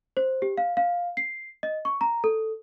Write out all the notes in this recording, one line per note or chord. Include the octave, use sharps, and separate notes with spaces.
C5
G4
F5
F5
C7
D#5
C#6
A#5
A4